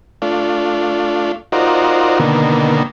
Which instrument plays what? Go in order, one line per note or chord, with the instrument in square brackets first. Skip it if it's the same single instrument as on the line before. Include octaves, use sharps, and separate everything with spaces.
[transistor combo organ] A3 D4 F4
D#4 F4 F#4 A#4 C5 D5
B2 D3 D#3 A#3